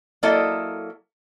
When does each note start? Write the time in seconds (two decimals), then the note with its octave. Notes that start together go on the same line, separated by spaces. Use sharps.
0.23 F#3 A#3 E4 A4 D5 D#5